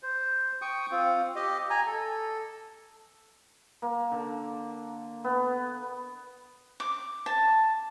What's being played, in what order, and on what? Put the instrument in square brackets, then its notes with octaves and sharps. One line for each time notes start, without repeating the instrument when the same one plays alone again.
[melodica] C5
G5 C#6 D#6
C4 F4
G4 D#5
G#5 A#5
A4
[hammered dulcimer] A#3
D3
B3
[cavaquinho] D6
A5